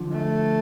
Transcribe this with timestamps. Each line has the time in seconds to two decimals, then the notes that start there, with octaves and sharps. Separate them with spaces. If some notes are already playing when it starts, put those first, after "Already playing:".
Already playing: D3 F3
0.12 A3